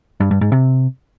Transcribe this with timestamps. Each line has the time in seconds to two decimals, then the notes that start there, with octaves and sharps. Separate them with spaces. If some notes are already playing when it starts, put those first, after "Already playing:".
0.20 G2
0.31 G2
0.41 G#2
0.52 C3